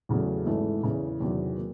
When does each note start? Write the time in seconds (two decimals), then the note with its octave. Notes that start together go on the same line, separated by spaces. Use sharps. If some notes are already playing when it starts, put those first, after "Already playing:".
0.09 E2 C#3 F#3 A3
0.46 G#1 G#2 E3 A3
0.83 E2 C#3 E3
1.20 E2 C3 D#3 F#3
1.58 A#3